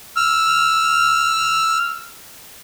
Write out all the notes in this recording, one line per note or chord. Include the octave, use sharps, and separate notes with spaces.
E6 F6